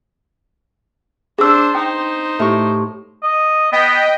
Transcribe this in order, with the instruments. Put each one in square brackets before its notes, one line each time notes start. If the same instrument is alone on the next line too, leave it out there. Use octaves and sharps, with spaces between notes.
[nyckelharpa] D4 C5 [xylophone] G#4 E6
[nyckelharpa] D#4 C5 [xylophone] G5
[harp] A2 G4 C#6
[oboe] D#5
[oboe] B3 [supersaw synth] D#5 G5